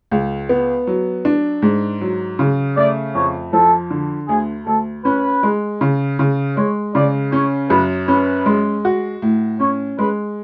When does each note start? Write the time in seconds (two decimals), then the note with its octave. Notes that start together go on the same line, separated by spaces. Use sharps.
0.11 C#2
0.49 B3
0.87 F#3
1.25 D4
1.62 G#2
2.01 F#3
2.39 C#3
2.77 A3 D5
3.15 F2 C#5
3.53 F3 A4
3.91 D3
4.29 D2 G#4
4.66 D2 A4
5.05 C#4 B4
5.43 G#3
5.81 C#3
6.19 C#3
6.57 G#3 C#5
6.95 C#3 D5
7.32 C#4 C#5
7.70 F#2 B4
8.08 C#4 B4
8.46 G#3
8.85 F#4
9.22 A2
9.60 C#4 C#5
9.98 G#3 B4